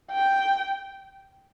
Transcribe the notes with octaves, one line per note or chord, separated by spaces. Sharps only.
G5